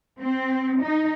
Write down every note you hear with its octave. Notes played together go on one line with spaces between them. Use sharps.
C4
D#4